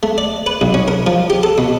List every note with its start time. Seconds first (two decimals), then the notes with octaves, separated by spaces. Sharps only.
0.03 A3
0.18 D5
0.46 B4
0.61 B1
0.74 C#4
0.88 A#4
1.06 F3
1.30 G4
1.43 A4
1.58 B2